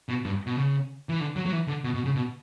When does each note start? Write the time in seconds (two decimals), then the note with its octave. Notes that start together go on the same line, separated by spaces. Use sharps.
0.09 B2
0.25 G2
0.47 B2
0.56 C#3
1.09 E3
1.20 D3
1.36 F#3
1.46 F#3
1.52 E3
1.67 D3
1.84 B2
1.94 B2
2.05 C#3
2.16 B2